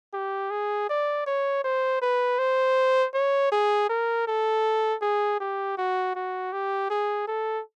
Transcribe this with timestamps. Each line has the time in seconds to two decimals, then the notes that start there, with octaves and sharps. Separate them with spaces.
0.13 G4
0.51 G#4
0.89 D5
1.27 C#5
1.64 C5
2.02 B4
2.39 C5
3.14 C#5
3.52 G#4
3.89 A#4
4.27 A4
5.02 G#4
5.40 G4
5.78 F#4
6.16 F#4
6.53 G4
6.90 G#4
7.28 A4